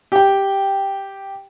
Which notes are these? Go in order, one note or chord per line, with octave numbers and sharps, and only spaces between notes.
G4 G5